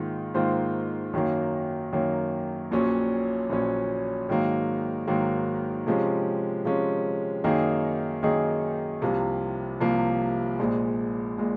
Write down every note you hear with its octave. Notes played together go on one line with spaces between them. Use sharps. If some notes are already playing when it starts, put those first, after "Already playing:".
Already playing: G#2 D#3 A#3 F4
G#2 D#3 A#3 F4 C5
F#2 D#3 F#3 A#3
F#2 D#3 F#3 A#3
A#1 A#2 F#3 C#4
A#1 A#2 F#3 C#4
G#2 D#3 F#3 A#3
G#2 D#3 F#3 A#3
C3 F3 G#3 C#4
C3 F3 G#3 C#4
F#2 D#3 A#3 D#4 G#4
F#2 D#3 A#3 D#4 G#4
C2 C3 F3 A#3
C2 C3 F3 A#3
A#1 A#2 G#3
A#2 G#3